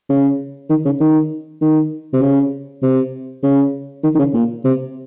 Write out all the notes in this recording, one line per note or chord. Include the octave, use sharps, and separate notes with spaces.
C#3
D#3
C#3
D#3
D#3
C3
C#3
C3
C#3
D#3
D#3
C#3
A#2
C3